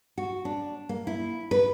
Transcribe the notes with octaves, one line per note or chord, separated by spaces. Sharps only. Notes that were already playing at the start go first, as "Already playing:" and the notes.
F#4
D4
A#3
E4
B4